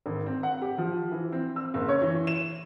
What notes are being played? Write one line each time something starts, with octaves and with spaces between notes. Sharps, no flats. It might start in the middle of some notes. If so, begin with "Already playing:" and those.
G#1
C4
F#5
G4
F3
E3
C4
E6
F#1
C#5
E3
E7